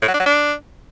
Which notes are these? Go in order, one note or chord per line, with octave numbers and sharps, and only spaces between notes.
A2
F#3
D4
F#3
D4